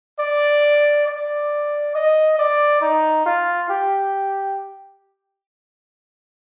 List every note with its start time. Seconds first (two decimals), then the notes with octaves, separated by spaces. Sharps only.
0.19 D5
1.07 D5
1.95 D#5
2.38 D5
2.81 D#4
3.26 F4
3.70 G4